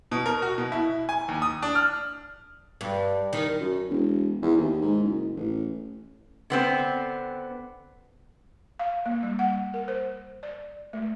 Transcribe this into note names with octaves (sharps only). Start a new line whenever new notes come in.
B2
A#4
F#4
B2
E4
G#5
D#2
D#6
D4
F6
G2
D#3
F#2
E1
E2
D#2
G#2
F#1
A1
D3 B3 C4
F5
A#3
G3
F#5
A#4
C5
D5
A3